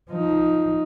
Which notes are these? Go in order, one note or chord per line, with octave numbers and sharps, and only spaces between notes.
F3 D#4